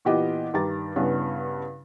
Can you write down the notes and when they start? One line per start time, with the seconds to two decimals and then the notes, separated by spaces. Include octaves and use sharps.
0.05 A#2 E3 B3 G4 D#5
0.53 G2 D#3 G4 A#5 A6
0.96 G2 C#3 B3 C#4 D4 E4